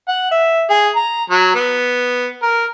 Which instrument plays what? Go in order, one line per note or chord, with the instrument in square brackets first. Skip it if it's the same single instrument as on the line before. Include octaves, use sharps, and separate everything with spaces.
[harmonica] F#5
E5
G#4
A#5
F#3
B3
A#4